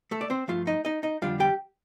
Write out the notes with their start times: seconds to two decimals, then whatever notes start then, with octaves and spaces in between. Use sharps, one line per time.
0.11 A3 A4
0.21 D5
0.30 C4 C5
0.48 G2 F3 A3 F4 F5
0.67 D#4 D#5
0.85 D#4 D#5
1.03 D#4 D#5
1.22 F2 D3 G3 D4 F4 F5
1.40 G4 G5